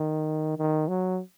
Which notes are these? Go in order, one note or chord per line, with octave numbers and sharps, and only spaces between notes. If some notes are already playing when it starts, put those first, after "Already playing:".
Already playing: D#3
D#3
F#3